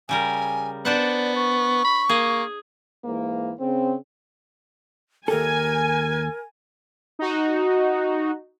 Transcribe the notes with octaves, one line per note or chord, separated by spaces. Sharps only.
C#3 G3 A#4 G#5
B3 D4 C5 D5 F#5
C#6
B5
A#3 G#4
G#2 E3 A#3
C#3 C4
D#2 G4 A4 A#4 G#5
D#4 F#4